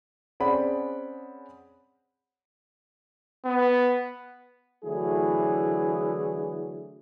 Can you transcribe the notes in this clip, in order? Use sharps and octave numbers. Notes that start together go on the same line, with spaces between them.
C4 C#4 G#4 D5 F#5 B5
B3
D3 E3 F#3 A3 E4 G#4